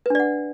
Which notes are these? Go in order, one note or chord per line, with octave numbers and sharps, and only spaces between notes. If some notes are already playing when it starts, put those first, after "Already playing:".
D4 B4 D5 F#5